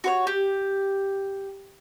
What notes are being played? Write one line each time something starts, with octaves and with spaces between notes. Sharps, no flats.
F#4 C5 C#5
G4